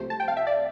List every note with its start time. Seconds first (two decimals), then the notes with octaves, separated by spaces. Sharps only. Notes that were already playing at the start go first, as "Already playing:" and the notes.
Already playing: C2 C3 F3 A3 C5
0.10 A5
0.20 G5
0.28 F5
0.37 E5
0.47 D5